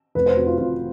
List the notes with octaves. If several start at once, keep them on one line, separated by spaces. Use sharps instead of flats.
F1 B4
C5
F2 F#4
F4
F2 F4